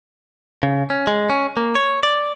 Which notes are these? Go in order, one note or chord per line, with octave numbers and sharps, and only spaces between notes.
C#3
C#4
G#3
C#4
A#3
C#5
D5